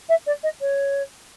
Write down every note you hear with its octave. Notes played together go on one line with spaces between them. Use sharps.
E5
D5
D#5
C#5